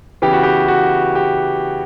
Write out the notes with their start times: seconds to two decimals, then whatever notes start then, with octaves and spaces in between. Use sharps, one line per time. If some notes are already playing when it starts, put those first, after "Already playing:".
0.22 C#3 E3 B3 G4
0.33 F#4
0.43 G4
0.68 F#4
1.15 G4